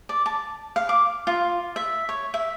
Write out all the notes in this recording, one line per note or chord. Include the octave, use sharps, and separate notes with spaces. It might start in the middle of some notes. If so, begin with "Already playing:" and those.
D5
A5
F5
D6
F4
E5
C#5
E5